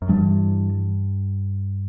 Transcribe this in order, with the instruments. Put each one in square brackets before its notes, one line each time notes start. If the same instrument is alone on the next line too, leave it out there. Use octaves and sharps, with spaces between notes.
[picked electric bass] F#2
[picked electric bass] G2 [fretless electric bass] E3 G3 D4